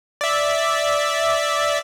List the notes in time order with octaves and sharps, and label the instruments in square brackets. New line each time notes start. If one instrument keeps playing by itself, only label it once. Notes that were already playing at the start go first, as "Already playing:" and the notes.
[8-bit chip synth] D5 E5